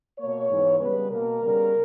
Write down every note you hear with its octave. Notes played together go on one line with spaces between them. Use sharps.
B2 A#3 C#5
G#2 E3 G#3 B3
C#3 G3 B3 B4
B2 A#3 A#4
C#3 G3 B3